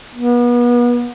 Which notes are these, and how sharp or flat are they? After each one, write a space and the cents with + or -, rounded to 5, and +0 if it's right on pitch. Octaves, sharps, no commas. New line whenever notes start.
B3 -35